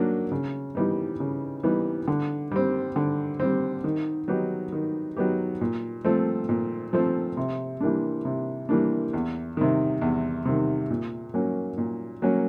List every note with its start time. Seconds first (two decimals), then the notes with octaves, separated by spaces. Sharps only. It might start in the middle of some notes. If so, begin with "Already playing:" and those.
Already playing: F#3 A#3 D4
0.32 C#3
0.75 E3 G3 B3 D#4
1.20 C#3
1.63 E3 G3 B3 D#4
2.07 D3
2.51 G3 C4
2.96 D3
3.40 G3 C4
3.84 D#3
4.28 F#3 B3 D#4 G4
4.72 D#3
5.16 F#3 B3 D#4 G4
5.61 A#2
6.05 F3 A3 C4
6.49 A#2
6.93 F3 A3 C4
7.37 C3
7.81 E3 G3 A#3 D4
8.25 C3
8.69 E3 G3 A#3 D4
9.14 E2
9.57 C3 D#3
10.02 E2
10.45 C3 D#3
10.90 A#2
11.34 F#3 A#3 C#4
11.78 A#2
12.22 F#3 A#3 C#4